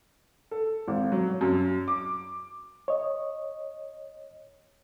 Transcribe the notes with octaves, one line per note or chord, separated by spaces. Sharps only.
A4
G#1
F#3
F#2
D6
C#5 D#5